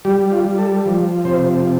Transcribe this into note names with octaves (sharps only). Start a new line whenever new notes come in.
G3 G4
F4
G3
A4
F3
C3 C5